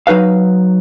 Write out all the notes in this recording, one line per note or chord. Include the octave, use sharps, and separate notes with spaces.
F#3 D#4 B4 F5